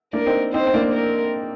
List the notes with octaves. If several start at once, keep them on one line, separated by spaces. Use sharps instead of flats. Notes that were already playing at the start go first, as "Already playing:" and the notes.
A#3 D4 A#4
C4 D#4
C4 D#4 C5
C4
A#3 D4
A#4